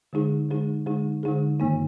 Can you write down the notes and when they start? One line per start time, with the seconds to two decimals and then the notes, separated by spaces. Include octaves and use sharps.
0.13 D3 G#3 D#4 G#4
0.49 D3 G#3 D#4 G#4
0.86 D3 G#3 D#4 G#4
1.23 D3 G#3 D#4 G#4
1.60 G2 D#3 A#3 D#4